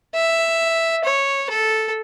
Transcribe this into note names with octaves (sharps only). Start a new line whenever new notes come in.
E5
C#5
A4